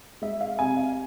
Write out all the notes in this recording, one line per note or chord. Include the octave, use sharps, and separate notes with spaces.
G#3 E5
F5
C3 G#5
F5